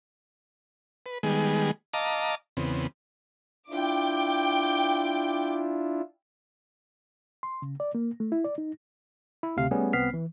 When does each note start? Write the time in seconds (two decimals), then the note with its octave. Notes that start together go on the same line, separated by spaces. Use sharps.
1.06 B4
1.23 D#3 G3 G#3 B3 G#4
1.94 D#5 F5 A5 A#5 D6
2.57 E2 C#3 B3 C4
3.70 D4 E4 F4 G5 D6
7.43 C6
7.62 C#3
7.80 D5
7.95 A#3
8.20 A3
8.32 E4
8.44 D5
8.58 D#4
9.43 E4
9.57 D2 C3 F5
9.71 G3 A3 B3 C#4 G#4
9.93 C2 B3 C4 F6 B6 C7
10.13 E3